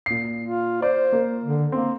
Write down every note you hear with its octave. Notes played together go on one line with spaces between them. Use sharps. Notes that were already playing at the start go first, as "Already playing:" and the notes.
A#2 C7
F4
C5 D5
A#3
D3
A#3 C4